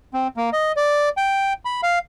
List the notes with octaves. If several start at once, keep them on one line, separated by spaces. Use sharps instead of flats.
C4
A#3
D#5
D5
G5
B5
F5